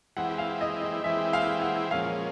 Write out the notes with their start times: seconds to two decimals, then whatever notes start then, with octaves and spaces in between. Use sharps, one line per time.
0.17 E3 G#3 C4 E4 G4 F#5
0.38 F5
0.61 D#5
0.82 D#5
1.04 E3 G#3 C4 E4 G4 E5
1.33 F5
1.62 F#5
1.91 A#2 F3 G#3 C#4 F5